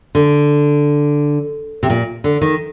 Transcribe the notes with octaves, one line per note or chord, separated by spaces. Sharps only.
D3
C3
A#2
D3
D#3